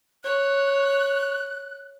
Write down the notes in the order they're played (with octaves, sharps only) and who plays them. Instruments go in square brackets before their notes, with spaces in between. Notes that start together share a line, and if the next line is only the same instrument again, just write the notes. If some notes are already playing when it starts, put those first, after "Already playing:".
[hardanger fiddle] C#5 [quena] F#6